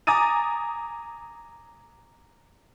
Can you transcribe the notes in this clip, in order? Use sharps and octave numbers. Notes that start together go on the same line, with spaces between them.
G#5 A#5 D6 D#6 A6 D#7